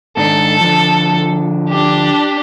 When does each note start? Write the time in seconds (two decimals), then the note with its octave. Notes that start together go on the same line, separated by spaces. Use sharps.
0.17 G#2 D#3 D4 A4
0.60 D3 F3
1.70 D4 G4